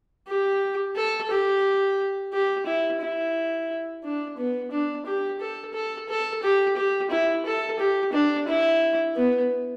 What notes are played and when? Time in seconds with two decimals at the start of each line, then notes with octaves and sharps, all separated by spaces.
0.28 G4
0.96 A4
1.31 G4
2.33 G4
2.66 E4
3.01 E4
4.04 D4
4.38 B3
4.71 D4
5.06 G4
5.40 A4
5.74 A4
6.09 A4
6.43 G4
6.77 G4
7.11 E4
7.46 A4
7.79 G4
8.13 D4
8.48 E4
9.16 B3